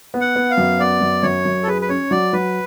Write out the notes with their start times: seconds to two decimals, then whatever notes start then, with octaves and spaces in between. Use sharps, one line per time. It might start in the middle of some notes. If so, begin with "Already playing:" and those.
0.14 B3
0.21 F#5
0.36 B3
0.51 F5
0.57 F#2
0.79 B3 D5
1.01 F#2
1.23 F#2 C#5
1.45 F#2
1.63 A4
1.68 G#4 B4
1.82 B4
1.89 C#4 C#5
2.11 F#3 D5
2.33 F#3 B4